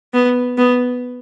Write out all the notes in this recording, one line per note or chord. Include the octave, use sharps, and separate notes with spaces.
B3
B3